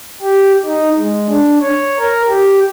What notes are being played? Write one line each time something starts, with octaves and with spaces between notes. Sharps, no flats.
G4
D#4
G#3
D4
C#5
A#4
G4